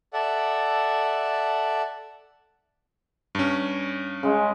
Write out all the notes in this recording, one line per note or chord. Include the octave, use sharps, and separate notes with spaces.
A4 D5 E5 F#5
G2 C#4
C#3 G#3